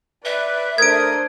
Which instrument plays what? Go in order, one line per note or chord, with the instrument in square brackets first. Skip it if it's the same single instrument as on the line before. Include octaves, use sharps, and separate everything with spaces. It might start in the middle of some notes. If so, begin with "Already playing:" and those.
[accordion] B4 [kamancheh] D5 [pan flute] E5
[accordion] A3 A#4 D#6 [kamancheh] D4 C5 [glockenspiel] G#6 D7